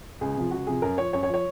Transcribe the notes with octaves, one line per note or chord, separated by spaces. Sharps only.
C#2 G#4
C3 F3
C#2 F#4
C3 F3 G#4
F#2 A#4
F3 C#5
F#2 C#5
C#5
F3
C#5